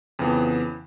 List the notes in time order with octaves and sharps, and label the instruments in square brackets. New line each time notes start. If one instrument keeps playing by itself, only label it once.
[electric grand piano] F2 C#3 E3 B3